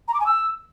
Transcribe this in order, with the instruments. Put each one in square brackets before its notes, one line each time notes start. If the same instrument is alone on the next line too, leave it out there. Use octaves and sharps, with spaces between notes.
[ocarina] A#5
D6
G#5
E6